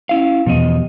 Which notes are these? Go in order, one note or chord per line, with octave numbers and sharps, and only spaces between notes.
C#4 E4 F5
E2 B2 F3 G3 D#5